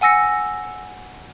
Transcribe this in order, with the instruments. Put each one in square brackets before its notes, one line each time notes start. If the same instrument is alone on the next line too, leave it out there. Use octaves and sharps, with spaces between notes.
[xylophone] F#5 G#5 E6 A#6 C#7